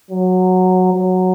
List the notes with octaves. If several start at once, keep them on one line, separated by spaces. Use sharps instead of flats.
F#3
F#3